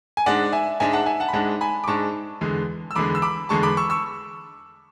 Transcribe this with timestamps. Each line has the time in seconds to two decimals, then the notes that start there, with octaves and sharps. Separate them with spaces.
0.17 G#5
0.26 G#2 G#3 D4 D5 F#5
0.52 E5 G#5
0.80 G#2 G#3 D4 E5 G#5
0.93 F#5 A5
1.06 E5 G#5
1.20 F#5 A5
1.28 B5
1.33 G#2 G#3 D4 F#5 A5
1.61 G#5 B5
1.84 D6
1.87 G#2 G#3 D4 A5 C#6
2.41 E2 D3 G#3
2.91 E6
2.95 E2 D3 G#3 B5 D6
3.15 E6
3.22 B5 D6
3.49 E2 D3 G#3 A5 C#6
3.63 B5 D6
3.77 C#6 E6
3.90 C#6 E6